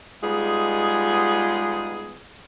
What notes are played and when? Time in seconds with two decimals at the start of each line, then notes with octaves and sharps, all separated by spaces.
0.23 G3 G#3 B3 D#4 F4 G#4